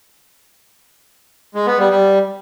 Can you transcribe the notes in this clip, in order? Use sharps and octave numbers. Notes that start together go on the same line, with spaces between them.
G#3
B3
G3
G3